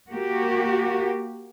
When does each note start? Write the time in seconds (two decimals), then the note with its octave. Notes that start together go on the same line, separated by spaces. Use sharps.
0.13 A#3 F#4 G4